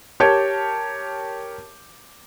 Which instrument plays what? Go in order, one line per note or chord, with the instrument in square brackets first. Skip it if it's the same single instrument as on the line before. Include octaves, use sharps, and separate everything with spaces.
[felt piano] G4 A#4 C#5 A5 G6